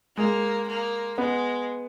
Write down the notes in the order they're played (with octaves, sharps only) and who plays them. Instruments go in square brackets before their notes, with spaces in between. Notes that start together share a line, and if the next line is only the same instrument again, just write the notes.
[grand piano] G#3 [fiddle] A#3
[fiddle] A#3
[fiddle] G#3 [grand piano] B3